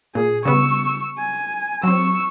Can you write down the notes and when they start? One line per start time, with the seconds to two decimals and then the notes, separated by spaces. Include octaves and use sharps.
0.15 A#2 G#4
0.45 C#3 G3 B3 C#6 E6
1.18 G#5
1.83 F#3 C4 C#6 E6